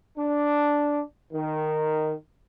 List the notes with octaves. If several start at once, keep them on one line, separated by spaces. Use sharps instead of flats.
D4
D#3